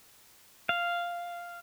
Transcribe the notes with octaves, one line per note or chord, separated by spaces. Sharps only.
F5